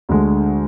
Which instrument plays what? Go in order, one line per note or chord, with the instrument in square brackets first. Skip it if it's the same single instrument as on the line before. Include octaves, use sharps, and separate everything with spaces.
[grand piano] D2 D3 G#3